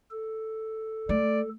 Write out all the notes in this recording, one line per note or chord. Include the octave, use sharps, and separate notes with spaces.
A4
A3 D5